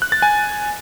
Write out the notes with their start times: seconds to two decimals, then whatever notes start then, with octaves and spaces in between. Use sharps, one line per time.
0.02 F#6
0.12 A6
0.22 G#5